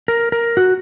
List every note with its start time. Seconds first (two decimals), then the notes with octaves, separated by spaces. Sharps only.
0.08 A#4
0.32 A#4
0.57 F#4